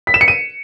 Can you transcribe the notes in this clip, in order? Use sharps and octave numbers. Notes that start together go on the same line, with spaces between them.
B6
E7
C#7
D#7